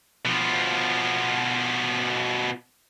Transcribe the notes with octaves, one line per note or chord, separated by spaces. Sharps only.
B2 F3